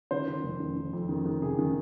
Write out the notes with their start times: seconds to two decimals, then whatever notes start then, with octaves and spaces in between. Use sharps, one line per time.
0.11 D#3 C5
0.28 D#3
0.44 F1
0.60 D#3
0.77 D#3
0.93 F2
1.09 D#3
1.26 D#3
1.42 C3 G#4
1.59 D#3